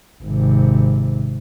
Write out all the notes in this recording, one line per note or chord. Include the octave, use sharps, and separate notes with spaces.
G#1 C3